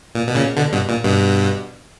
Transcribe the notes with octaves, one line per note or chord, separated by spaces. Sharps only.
A#2
B2
A#2 C#3
B2 D3
G2 B2
A#2
G2 B2